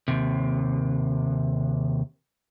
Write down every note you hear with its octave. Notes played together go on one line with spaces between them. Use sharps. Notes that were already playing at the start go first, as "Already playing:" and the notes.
D#2 C3